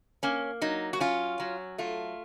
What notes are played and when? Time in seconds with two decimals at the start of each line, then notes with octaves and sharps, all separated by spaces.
0.23 A#3 C#4
0.62 F#3 D#4
0.93 F#4
1.00 C#4 F4
1.40 F#3
1.78 A3 F4